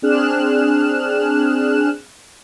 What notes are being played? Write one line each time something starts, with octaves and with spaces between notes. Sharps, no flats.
C4 D4 G#4 F6 F#6 E7